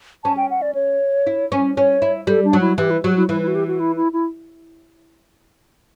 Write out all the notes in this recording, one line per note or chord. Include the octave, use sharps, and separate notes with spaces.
C#4 A5
G5
F#5
D5
C#5
E4
C#4
C#4 C#5
E4
G3 A4
D4
F#3
E4
E3 G4
E4
F#3 G4
E4
E3 E4
E4
F#4
G4
F#4
E4
E4
E4